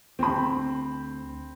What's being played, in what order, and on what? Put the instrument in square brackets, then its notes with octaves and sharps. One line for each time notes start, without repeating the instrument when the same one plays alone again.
[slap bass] D2 [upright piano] C4 B5